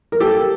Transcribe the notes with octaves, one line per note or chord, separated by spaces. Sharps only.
A#4
A#3 G4 A4